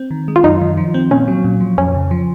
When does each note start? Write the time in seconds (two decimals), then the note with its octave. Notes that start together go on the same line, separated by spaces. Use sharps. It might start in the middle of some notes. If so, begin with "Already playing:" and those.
Already playing: C4
0.11 D#3
0.28 G#3
0.36 F4
0.44 F#2 D#4
0.61 D#3
0.77 F3
0.94 C4
1.11 A#2 C#4
1.28 F#3
1.44 A#2
1.61 F3
1.78 F2 C#4
1.95 C#3
2.11 F3